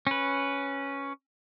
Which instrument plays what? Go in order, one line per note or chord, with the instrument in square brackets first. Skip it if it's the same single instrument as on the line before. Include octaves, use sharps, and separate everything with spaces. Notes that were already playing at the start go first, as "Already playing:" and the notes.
[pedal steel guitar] C#4 B4